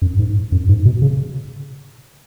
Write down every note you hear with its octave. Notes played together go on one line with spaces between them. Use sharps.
F#2
G#2
F#2
G#2
B2
C#3